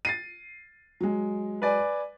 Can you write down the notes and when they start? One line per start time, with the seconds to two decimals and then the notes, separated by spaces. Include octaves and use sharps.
0.05 A6 C7 D#7
1.00 F#3 G#3
1.62 B4 D5 G#5